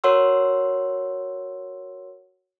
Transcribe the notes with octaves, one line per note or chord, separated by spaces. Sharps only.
F#4 A#4 C#5 F#5 C6 E6